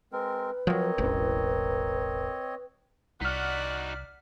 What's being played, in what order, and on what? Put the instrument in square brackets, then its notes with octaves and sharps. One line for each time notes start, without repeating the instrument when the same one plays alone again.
[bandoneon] G#3 C4 A#4 [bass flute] B4
[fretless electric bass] F3 F#3 [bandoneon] C4 C#5 D#5 [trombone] A#4
[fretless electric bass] E1 A1
[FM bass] C2 [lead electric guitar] D#4 F#4 [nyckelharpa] D5 F#5 [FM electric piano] F6 B6